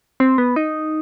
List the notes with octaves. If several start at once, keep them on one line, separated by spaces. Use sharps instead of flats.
C4
B3
D#4